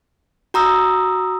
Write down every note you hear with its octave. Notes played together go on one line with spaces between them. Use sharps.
F#4 A#5 D#6 E6